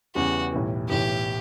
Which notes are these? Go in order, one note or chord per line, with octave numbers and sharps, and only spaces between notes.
E2 C#3 E3 G3 B3 F#4
B1 A2 E3 G3
B1 A2 E3 G4